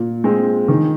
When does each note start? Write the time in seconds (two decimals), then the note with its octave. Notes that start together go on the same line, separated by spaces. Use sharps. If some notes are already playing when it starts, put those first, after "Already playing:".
Already playing: A#2
0.24 G#3 C4
0.68 D#3